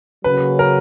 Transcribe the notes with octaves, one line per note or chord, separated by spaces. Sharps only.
C#3 F#3 A#3 C#4 F#4 B4
A#4